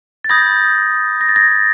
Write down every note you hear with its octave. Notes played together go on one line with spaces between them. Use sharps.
A6
B5 D#6 G6 G#6 A#6
A#6
A6
G#6 A#6